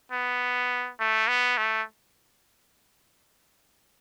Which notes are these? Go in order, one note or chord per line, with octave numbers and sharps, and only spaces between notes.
B3
A3
B3
A3